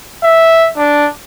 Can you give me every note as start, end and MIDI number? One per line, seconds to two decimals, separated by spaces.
0.23 0.69 76
0.77 1.07 62